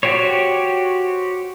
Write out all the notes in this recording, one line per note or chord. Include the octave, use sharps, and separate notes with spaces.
F#4 G4 C5 C#5